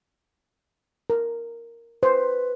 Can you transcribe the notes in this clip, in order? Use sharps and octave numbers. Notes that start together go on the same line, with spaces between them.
A#4
B4 C5